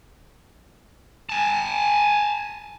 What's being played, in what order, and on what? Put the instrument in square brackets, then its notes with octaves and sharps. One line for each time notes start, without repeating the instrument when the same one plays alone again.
[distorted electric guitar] G#5 A5